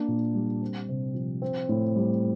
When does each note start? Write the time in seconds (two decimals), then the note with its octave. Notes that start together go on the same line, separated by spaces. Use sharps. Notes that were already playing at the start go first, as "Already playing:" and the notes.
Already playing: A#3 D4
0.08 A#2
0.34 G3
0.62 C4
0.89 C3
1.15 F3
1.42 C4
1.69 A2
1.96 G3